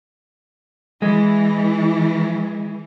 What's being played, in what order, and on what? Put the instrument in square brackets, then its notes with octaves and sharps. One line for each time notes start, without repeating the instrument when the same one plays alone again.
[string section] E3 [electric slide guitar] G#3